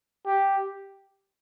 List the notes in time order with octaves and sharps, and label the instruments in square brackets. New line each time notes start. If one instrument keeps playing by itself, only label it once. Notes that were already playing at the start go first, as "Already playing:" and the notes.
[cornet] G4